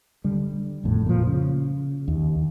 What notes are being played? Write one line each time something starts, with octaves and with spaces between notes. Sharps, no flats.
D3 G3
G#1 F2 A2
A#2 F3
C#3
D#2